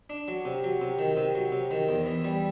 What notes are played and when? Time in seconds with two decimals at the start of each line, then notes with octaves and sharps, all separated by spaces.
0.10 D4
0.28 F#3
0.45 C3
0.64 F#3
0.81 C3
0.99 D#3
1.17 C3
1.35 F#3
1.52 C3
1.71 D#3
1.89 E2
2.06 E3
2.24 G3